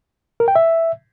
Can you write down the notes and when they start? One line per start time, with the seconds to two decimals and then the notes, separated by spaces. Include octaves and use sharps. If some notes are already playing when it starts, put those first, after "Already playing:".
0.40 A#4
0.48 G5
0.55 E5